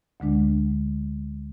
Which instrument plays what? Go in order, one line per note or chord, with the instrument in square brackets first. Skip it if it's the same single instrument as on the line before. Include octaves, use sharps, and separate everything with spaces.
[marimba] D2 D3 G#3 D4